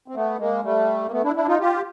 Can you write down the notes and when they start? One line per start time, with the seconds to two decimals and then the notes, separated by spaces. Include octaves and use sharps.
0.08 C4
0.15 A3 B3
0.39 G#3 A#3
0.63 G3 A3
1.07 A#3
1.11 A3 B3
1.23 D4 E4
1.36 D4 E4
1.47 D#4 F4
1.60 F4 G4